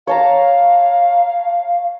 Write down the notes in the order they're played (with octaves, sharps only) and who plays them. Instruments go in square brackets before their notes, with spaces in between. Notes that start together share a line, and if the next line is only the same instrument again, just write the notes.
[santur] C#5 A5 A#5 [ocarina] F5